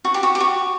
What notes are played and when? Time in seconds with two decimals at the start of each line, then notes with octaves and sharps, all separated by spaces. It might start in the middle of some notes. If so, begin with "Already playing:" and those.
0.05 F#4
0.14 G4
0.23 F#4
0.35 G4
0.40 F#4